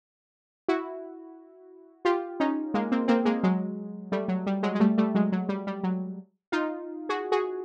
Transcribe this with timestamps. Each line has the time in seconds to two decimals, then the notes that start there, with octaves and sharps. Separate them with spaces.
0.68 E4 F#4
2.05 F4 G4
2.40 C#4 D#4
2.74 G#3 A#3
2.91 A#3 C4
3.08 A#3 C4
3.25 G#3 A#3
3.43 F#3 G#3
4.12 G3 A3
4.28 F#3
4.46 G3
4.63 F#3 G#3
4.75 G#3
4.80 G3 A3
4.98 G3 A3
5.15 F#3 G#3
5.32 F#3
5.49 G3
5.67 G3
5.83 F#3
6.52 D#4 F4
7.09 F#4 G#4
7.32 F#4 G#4